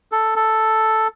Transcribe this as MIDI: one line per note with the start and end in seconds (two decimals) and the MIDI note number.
0.12 0.34 69
0.36 1.08 69